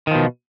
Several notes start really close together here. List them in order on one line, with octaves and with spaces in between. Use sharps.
D#3 F3 B2